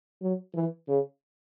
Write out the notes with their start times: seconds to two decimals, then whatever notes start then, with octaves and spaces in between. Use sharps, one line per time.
0.22 F#3
0.55 E3
0.88 C#3